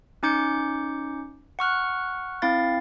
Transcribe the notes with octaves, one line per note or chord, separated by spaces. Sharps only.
C#4 D#4 D6 G6 C#7
F#5 C#6 F6 F#6
C4 E4 F5 A6